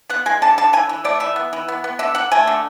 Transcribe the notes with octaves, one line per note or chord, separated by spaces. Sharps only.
B3 F#5
G#3 G#5
D3 A5
D3 A5
E3 G#5
E3
A3 D5
E3 E5
B3
E3
B3
B3
D3 E5
D3 F#5
A3 G#5
D3